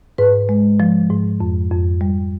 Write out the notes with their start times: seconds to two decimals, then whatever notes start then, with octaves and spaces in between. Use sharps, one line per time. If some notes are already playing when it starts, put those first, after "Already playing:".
0.18 G#2 B4
0.49 G#3
0.80 F3
1.10 G#2
1.40 F2
1.71 F2
2.01 G3